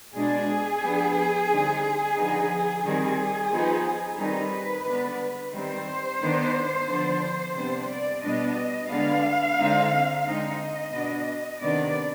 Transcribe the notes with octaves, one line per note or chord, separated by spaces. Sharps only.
B2 G#3 D4 G#4
F3 B3 D4
D3 G3 C4 D#4
D3 F3 B3 D#4
D#3 G3 C4 G#4
F3 B3 D#4
D#3 G3 C4 D#4 B4
D3 G#3 B3 D4
D#3 G3 C4 C5
D#3 B3 D4
D3 F3 B3 D4
C3 G3 B3 D4 C5
D5
B2 G3 B3 D4 D#5
D3 G#3 B3 D4 F5
D3 G#3 C4 D#4
D3 G#3 C4 D#4 D#5
B2 B3 D4
C3 D#3 B3 D4 D5